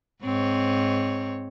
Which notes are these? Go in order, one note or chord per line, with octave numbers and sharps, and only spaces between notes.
G#2 C4 C#5